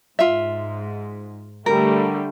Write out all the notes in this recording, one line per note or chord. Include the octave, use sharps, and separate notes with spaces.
G#2 F4 E5
D3 G3 A3 A#4